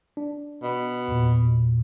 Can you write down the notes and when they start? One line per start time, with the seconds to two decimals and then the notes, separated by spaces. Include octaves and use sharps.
0.17 D4
0.63 B2
1.08 E2 A#2